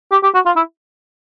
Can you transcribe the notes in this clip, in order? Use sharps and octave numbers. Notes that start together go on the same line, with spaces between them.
G4
G4
F#4
F4
E4